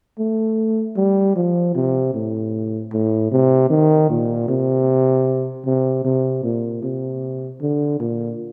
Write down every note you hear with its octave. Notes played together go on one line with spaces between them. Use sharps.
A3
G3
F3
C3
A2
A2
C3
D#3
A#2
C3
C3
C3
A#2
C3
D3
A#2